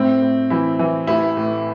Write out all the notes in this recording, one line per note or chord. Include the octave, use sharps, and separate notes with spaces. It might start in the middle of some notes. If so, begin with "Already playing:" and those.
Already playing: A2 C4
A2
E3 E4
E3
A1 E4
A2